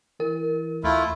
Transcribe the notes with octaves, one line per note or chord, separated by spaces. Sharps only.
E3 A#4
D2 A3 E4 F4